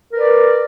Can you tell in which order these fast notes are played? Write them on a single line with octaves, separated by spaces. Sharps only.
A#4 B4 D5